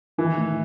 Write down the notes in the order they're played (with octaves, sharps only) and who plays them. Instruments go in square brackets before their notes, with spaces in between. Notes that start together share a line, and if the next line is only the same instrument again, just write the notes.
[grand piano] D#3 [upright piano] E3
[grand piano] A3 D#4